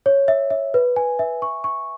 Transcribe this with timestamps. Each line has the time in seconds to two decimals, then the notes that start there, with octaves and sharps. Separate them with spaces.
0.06 C#5
0.28 E5
0.50 E5
0.74 B4
0.96 G#5
1.19 E5
1.42 C#6
1.64 C#6